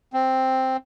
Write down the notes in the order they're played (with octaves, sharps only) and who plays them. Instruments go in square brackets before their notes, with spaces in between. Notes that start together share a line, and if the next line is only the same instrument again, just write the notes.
[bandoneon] C4